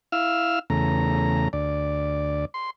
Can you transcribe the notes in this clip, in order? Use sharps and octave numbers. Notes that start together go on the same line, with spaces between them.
E4 F5 E6 F6
E2 C#3 A3 A#5
D2 D5
C6